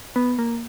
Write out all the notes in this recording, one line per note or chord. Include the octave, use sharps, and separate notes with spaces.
B3
A#3